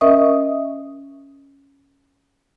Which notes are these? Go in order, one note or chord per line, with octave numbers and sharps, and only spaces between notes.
C#4 A#4 D#5 E5 C#6 D#6